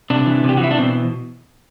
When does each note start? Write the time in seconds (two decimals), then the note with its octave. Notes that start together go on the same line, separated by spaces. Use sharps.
0.10 C3 D4
0.26 E3
0.44 C3 G4
0.57 F#4
0.61 E3 E4
0.71 D4
0.78 B2 C4